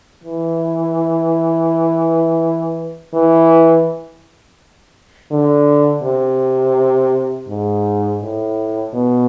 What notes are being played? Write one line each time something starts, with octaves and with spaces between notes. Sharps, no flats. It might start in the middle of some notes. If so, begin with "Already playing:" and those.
E3
E3
D3
C3
G#2
A2
B2